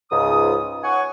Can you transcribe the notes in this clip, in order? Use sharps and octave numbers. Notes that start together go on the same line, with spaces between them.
C#2 G#2 D#6
C#5 F#5 G#5 C#6